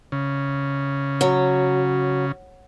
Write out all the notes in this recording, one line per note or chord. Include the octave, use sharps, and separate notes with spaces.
C#3
F#3